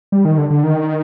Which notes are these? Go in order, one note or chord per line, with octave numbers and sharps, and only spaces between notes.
G3
D#3
D3
D3
D#3